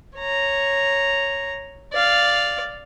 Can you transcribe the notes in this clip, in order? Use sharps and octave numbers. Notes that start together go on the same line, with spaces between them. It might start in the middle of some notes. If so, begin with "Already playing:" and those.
C#5 A#5
D5 F5